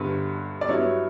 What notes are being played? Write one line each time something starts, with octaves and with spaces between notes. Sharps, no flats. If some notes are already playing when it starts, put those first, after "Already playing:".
Already playing: G1 G2 D3 B4
D5
G2 F#3 B3 E4 C#5